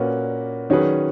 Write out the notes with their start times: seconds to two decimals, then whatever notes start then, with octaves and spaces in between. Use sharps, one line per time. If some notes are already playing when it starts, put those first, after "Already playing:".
Already playing: A#2 A#3 C#4 F#4 B4
0.70 D#3 F#3 C#4 G#4 B4